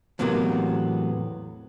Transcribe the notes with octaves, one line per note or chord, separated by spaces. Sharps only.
E2 A2 C3 F#3 A#3 B3